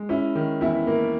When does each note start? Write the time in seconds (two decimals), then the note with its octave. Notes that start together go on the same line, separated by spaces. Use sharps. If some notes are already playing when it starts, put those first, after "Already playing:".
Already playing: G#3
0.09 C#4 E4 E5
0.35 D#3
0.61 E2 E4 E5
0.87 A#3